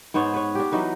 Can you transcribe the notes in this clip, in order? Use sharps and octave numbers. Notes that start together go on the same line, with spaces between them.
G#2 B3 C5 C#5
B4 C#5
D4 G4
E3 F#3 D#4 B4